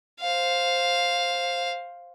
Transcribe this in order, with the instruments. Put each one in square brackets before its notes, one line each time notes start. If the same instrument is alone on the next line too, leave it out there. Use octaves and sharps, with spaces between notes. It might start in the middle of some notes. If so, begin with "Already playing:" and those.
[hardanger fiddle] C5 F5